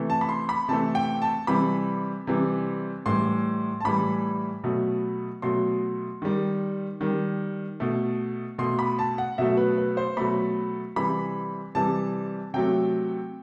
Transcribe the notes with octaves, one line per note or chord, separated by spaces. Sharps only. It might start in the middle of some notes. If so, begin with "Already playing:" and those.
Already playing: C3 E3 A3
A5
B5
C6
B5
C3 E3 A3 A5
G5
A5
C3 E3 G3 B5
C3 E3 G3
A2 E3 G3 C6
A5
A2 E3 G3 B5
B2 F#3 A3
B2 F#3 A3 C6
D#3 G3
D#3 G3
B2 A3
B2 A3 C6
B5
A5
F#5
B2 F#3 A3 E5
B4
B4
C5
B2 F#3 A3 B5
C3 E3 G3 B5
C3 E3 G3 A5
C3 F#3 A3 G5